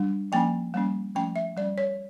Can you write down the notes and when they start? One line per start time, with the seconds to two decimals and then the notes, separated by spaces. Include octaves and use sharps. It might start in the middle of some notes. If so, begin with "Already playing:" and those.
Already playing: G3 D4
0.32 F3 A#3 C#4 G5
0.74 G3 A#3 C#4
1.15 F3 A3 C#4 G5
1.36 E5
1.57 G3 C#4 D5
1.78 C#5